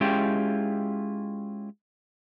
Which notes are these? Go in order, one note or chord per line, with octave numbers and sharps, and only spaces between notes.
G#3 C#4 E4 F4 G4 G5